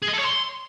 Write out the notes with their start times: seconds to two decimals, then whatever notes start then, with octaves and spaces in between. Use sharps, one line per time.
0.02 G#4
0.08 D#5
0.13 A4
0.19 C#5
0.24 C6